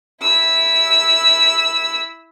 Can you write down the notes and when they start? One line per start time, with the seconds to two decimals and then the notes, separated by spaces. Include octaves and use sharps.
0.21 E4 E6